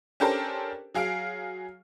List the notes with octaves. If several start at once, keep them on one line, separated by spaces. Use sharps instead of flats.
C#4 D4 G4 A4 A#4 C5
F#3 G#4 F5 F6 D7